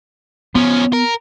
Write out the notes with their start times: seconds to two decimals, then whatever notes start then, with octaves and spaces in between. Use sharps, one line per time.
0.55 F3 B3 C#4
0.93 A#4